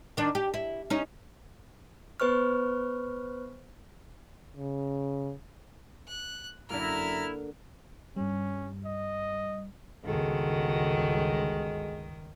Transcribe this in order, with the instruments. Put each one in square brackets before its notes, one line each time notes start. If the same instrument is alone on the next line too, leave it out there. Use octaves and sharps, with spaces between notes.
[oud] D#3 D4
G4
E4
C#4 D#4
[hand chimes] B3 B4 C5 C#6 F6
[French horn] C#3
[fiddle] F#6
[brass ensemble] F#2 A#5 [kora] D3 A#3 [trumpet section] E4 [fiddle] F6
[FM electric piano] G2 G3 [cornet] C#4
[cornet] D#5
[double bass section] G1 C#2 [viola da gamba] D#3 [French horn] G#3 [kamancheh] F#4 A4